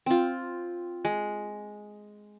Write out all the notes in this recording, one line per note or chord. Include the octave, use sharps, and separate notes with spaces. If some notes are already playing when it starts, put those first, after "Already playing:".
C4 F4
G#3